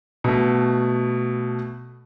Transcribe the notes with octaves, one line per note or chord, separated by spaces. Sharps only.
B2 A3